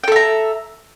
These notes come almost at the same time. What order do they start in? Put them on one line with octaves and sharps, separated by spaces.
G5 A4 E5 A#5